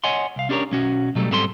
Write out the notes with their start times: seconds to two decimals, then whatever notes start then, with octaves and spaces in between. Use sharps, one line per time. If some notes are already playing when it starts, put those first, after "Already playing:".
0.04 C#5 D#5 F#5 G#5 C6
0.36 C2 F5
0.49 C#4 D4 G4 A4 A#4 C#5
0.72 B1 C#4 F#4
1.15 B2 F#3 G3 A3
1.31 G#2 G3 C4 A4 B5 C6